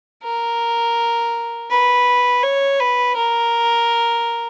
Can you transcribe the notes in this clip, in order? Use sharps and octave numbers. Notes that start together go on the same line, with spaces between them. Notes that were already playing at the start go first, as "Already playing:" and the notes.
A#4
B4
C#5
B4
A#4